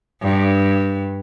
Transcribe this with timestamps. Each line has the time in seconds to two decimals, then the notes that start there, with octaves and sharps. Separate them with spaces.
0.22 G2